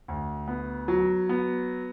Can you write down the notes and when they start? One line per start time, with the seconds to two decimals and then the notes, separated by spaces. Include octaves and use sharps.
0.08 D2
0.48 B3
0.88 F#3
1.29 B3